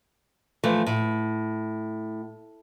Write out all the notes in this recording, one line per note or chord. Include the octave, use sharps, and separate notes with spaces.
E3 F3 A3
A2